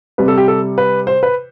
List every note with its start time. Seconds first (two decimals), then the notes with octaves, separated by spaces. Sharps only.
0.18 C3 G3 B4
0.28 A4
0.38 G4
0.48 A4
0.78 B4
1.07 C5
1.23 B4